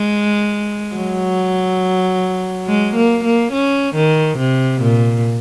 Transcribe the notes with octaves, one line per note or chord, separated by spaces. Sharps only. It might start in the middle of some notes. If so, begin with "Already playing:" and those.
Already playing: G#3
F#3
G#3
A#3
A#3
C#4
D#3
C3
A#2